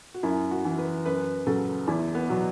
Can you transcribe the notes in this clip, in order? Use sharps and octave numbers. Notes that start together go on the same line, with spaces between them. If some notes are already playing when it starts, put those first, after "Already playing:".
F#4
F#2 E4
F#4
E3
B4
F#2 B4
C#3 F#3 A4
E2 E4
B3
B2 F#3